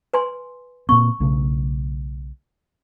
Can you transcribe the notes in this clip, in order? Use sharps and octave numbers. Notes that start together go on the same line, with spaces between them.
B4 G#5 C6
A#2 A#3 C4 C#6
B1 C#3 A3